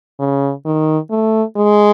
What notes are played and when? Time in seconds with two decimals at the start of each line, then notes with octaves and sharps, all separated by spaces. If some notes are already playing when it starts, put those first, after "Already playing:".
0.19 C#3
0.66 D#3
1.11 A3
1.57 G#3